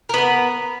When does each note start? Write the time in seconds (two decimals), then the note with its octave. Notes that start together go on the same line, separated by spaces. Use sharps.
0.09 A#4
0.14 B3
0.18 B4